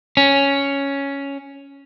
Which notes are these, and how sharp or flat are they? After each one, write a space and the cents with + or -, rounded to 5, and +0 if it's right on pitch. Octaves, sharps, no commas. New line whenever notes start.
C#4 +5